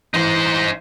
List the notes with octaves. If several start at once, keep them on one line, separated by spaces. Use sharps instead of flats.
A1 E3 D#4 C5